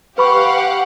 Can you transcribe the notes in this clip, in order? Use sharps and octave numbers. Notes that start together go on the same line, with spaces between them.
G4 B4 F5 F#5 B5 C#6